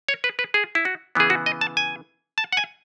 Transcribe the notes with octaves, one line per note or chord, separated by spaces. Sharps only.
C#5
B4
B4
G#4
E4
F#4
C#3 E3 B3 G#4
F#4
D#5
A5
G#5
A5
F#5
G#5